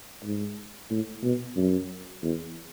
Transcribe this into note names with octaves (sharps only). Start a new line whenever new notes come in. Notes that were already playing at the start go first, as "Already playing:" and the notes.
G#2
A2
B2
F#2
E2